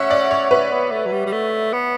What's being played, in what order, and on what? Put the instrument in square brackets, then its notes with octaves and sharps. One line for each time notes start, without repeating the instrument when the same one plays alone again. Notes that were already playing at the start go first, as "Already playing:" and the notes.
Already playing: [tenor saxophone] C#4 [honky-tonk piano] E5 F#5
[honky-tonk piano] D5
C#5
[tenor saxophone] C#4 [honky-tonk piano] B4
[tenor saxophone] B3
A3
F#3
G3
G3
A3
B3